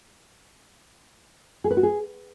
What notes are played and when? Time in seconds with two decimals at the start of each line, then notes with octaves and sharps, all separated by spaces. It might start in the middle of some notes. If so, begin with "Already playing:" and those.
1.64 G#4
1.71 B4
1.77 F#4
1.83 G#4